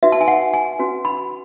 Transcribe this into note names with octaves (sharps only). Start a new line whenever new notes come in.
D#4 F#4 B4 E5
A5
G#5
F#5
G#5
C#4 F#4 B4
B5